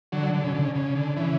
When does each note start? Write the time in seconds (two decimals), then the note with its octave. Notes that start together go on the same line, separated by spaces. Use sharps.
0.12 D3 F#3
0.34 D3
0.44 C#3
0.54 D3
0.64 C#3
0.75 C#3
0.95 D3
1.16 C#3 E3